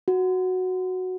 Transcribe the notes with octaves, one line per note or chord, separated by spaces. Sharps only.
F#4